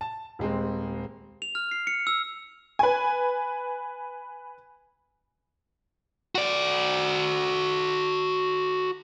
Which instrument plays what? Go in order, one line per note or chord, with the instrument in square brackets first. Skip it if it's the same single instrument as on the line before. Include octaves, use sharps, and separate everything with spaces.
[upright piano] A5
D#1 G#3 C4
[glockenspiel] F7
F6
C7
C#7
E6
[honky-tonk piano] B4 G#5
[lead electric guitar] F#4 D5